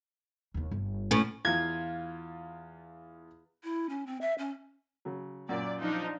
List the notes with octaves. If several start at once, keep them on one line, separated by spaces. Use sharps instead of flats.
D#2 D#3
G1
A2 C#4
E2 F4 G#6
E4
C#4
C4
E5
C#4
C#3 F#3
F#2 A#2 D5
F3 D4 D#4